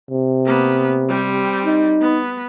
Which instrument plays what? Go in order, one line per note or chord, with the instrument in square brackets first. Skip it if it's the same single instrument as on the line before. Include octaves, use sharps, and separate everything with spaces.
[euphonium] C3
[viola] A#3 B3
G3 C4
[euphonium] D#4
[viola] B3